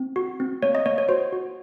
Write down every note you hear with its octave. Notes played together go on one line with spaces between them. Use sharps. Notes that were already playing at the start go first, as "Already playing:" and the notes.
Already playing: C4
F#4
C4
A#3 C#5
D#5
A#3 C#5
C#5
F#4 C5
F#4